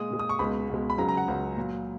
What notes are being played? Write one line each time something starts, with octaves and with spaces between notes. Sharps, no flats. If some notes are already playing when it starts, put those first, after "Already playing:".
Already playing: A#2 G#3 D#6
A#2 G#3
D#6
C#6
C#2 B2 G#3 B5
C#2 B2 G#3
B5
C#2 C#3 F#3 A#5
A#5
F#5
C#2 C#3 F#3
A#2 F#3